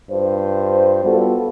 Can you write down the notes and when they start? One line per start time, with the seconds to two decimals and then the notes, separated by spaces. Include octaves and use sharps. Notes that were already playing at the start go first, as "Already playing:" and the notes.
0.11 G2 F4 C5
1.05 G3 B3 F4 F#4 A4